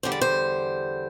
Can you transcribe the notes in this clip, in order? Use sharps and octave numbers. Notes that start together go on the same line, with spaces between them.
E2 D3 G3 C5
D5
C5